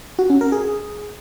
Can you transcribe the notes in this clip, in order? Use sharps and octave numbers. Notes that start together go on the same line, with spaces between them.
F#4
C#4
A#4
G#4